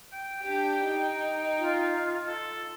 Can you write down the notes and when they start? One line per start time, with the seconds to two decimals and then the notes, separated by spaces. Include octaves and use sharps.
0.13 G5
0.42 D4 G4
0.89 D#4
1.59 F4
2.27 A4